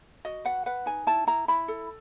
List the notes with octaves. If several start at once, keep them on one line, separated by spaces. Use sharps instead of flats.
F#4 D#5
B4 F#5
B4 F#5
D#4 G#5
E4 A5
E4 A#5
E4 B5
A4